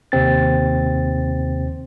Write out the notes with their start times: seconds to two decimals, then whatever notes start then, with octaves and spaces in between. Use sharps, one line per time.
0.12 D#2 C3 C4 A6